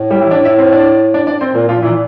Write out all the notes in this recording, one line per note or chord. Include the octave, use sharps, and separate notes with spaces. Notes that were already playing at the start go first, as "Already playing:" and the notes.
Already playing: A2
G3 G4
E3 E4
D4 D5
E4 E5
C4 C5
D4 D5
D4 D5
D4 D5
C4 C5
A#2 A#3 A#4
A#2 F3 F4
A#2 E3 E4